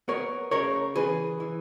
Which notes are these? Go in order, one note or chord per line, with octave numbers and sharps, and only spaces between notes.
B3 A#4 C#5
C#3 A#4 C#5
E3 G#4 B4
E3